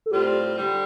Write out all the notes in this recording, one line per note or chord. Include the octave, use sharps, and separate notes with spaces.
A4
A2 G3 C4 F4 G4
D3 G3